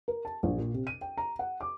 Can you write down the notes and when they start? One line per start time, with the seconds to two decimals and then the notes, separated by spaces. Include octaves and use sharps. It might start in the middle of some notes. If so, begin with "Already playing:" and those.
0.08 A#4
0.25 A5
0.43 A#1
0.58 A#2
0.74 C3
0.87 D#7
1.01 G5
1.18 A#5
1.39 F#5
1.61 D6